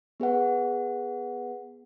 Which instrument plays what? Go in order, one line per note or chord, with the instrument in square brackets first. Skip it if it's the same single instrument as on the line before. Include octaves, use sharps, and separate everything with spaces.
[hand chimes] B3 G#4 B4 F#5